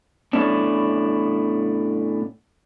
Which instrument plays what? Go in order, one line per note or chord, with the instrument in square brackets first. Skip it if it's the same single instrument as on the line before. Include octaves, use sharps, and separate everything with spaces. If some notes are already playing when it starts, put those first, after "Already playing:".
[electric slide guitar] A2 A3 B3 C#4 D4